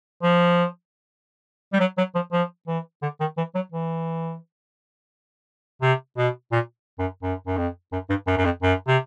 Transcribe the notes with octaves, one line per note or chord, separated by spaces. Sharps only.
F3
G3
F#3
F#3
F3
F3
E3
D3
D#3
E3
F#3
E3
C3
B2
A#2
F#2
F#2
F#2
F2
F#2
G2
F#2
F#2
F2
F#2
C3